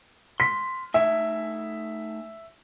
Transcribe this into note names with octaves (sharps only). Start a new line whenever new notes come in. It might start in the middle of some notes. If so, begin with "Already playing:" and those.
C6 B6
A3 D#4 E5 G#5